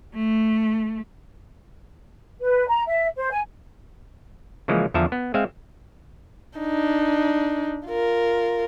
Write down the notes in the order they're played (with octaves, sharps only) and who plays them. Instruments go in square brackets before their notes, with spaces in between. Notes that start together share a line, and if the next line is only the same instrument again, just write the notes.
[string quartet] A3
[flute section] B4
A#5
E5
C5
G#5
[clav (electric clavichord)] C#3 E3 F3 G#3 A#3
E2 D3 F3 E5 A5 A#5
B3
G#3 C4 E5 F5
[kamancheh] D4 D#4
F4 A#4